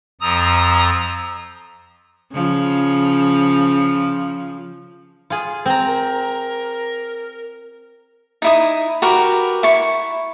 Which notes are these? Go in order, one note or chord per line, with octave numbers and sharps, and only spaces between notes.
F2 F3 A#5 D#6 E6
C#3 F3
F4 G#4
C4 A#5
A#4
D#4 E4 D#6
F#4 G4 A#4 B4
E4 C#6